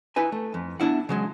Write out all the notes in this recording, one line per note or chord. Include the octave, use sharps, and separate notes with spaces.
D#4 E4 B4 G#5
A3
F2
B3 D4 E4 F#5
C#3 F#3 G#3